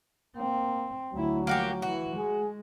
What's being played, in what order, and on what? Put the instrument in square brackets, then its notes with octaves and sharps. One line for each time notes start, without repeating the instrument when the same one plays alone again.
[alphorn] A#3 [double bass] C4
[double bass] D2 E4 [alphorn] F#3
[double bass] F3 [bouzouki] A#3 F#4 G4
[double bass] E3 [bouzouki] F#4
[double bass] G#3 [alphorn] G#4